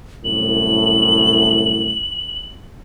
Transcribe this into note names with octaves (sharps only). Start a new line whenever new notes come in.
C2 F#2 A2 F#7